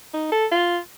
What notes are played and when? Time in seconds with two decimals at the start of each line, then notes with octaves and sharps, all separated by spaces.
0.13 D#4
0.32 A4
0.52 F4